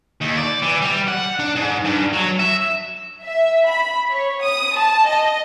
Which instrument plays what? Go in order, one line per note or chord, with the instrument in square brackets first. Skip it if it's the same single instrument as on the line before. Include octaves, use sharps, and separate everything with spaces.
[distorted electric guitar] D#2
D5
E3
G3
F#5
D4
G#2
G2
F#3
E5
[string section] E5
B5
C#5
D#6
A5
D#5